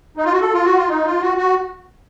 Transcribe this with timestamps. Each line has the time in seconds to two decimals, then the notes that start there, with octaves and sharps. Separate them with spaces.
0.17 D#4
0.25 F4
0.32 F#4
0.41 A4
0.53 F4
0.65 F#4
0.77 F4
0.89 D#4
1.05 F4
1.21 F#4
1.38 F#4